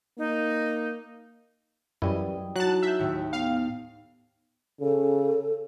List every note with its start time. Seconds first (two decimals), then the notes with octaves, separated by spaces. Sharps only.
0.18 A#3 D#4
2.02 F#2 E3 G3 E4 D#5
2.17 G5
2.56 F#3 D#4 E4 F#4 A5 F#6
2.82 G#4 E5 F#6 G6
2.99 D#2 A2
3.33 B3 F5 G5
4.80 C#3 A4